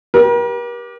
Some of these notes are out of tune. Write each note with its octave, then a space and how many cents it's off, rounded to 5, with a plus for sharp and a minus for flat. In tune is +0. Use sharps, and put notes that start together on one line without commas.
G4 +0 A#4 +45